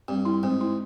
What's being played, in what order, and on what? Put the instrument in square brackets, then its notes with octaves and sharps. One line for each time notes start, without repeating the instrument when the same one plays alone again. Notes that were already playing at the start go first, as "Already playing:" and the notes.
[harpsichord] G2 [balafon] C4
[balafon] E4
[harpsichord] G#2 [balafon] C4
[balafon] E4